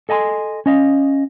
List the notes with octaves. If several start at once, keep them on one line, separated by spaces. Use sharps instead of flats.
A4 D#5 G#5 A5 C6
C#4 D#5 F5